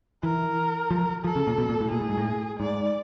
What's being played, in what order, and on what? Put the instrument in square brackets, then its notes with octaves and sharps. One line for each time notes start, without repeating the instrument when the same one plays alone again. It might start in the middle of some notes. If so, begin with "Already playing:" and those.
[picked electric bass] E3 [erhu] A#4
[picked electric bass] F3
[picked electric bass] F3 [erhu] A4
[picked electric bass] C#3
A#2
B2
A#2
A2
[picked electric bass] A#2 [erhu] G#4
[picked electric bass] A2
G#2
A2
[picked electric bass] G#2 [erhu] D5